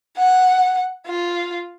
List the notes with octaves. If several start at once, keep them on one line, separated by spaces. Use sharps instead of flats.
F#5
F4